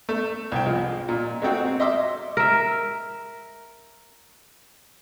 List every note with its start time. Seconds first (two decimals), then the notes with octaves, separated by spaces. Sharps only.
0.09 A3
0.52 C2 G5
0.66 F3 G#3
1.09 A#2
1.42 G#3 A3 C4 F#4
1.80 D#5 E5 C6 D6 E6
2.37 A#4 E5